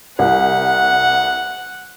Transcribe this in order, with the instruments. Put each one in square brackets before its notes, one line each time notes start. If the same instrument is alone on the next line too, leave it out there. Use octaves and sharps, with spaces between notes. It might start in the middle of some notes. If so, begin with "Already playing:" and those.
[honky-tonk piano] C2 [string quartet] F#5